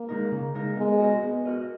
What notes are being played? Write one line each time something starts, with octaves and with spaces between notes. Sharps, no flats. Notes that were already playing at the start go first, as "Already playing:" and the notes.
Already playing: A#3
G#3 D#4 A#4
C#3
G#3 D#4 A#4
G#3 B3
F#4 A#4 D#5
B3
F#4 A#4 D#5